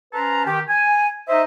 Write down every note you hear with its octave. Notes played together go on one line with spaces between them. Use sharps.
C#4 B4 C5 A5 A#5
D#3 G4
G#5
D#4 C5 D#5 E5